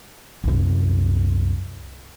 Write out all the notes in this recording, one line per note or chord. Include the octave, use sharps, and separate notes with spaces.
C2 F#2